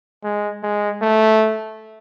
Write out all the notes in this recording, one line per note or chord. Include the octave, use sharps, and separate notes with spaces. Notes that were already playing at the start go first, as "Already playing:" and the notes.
G#3
G#3
A3